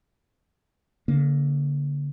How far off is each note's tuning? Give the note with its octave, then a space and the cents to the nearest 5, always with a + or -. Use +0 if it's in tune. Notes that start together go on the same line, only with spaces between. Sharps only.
D3 -35 A#3 +0